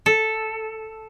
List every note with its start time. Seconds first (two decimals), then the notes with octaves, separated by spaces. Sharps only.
0.06 A4